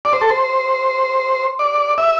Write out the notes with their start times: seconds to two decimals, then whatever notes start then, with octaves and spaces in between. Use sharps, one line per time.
0.05 D5
0.13 C5
0.21 A4
0.30 C5
1.59 D5
1.98 E5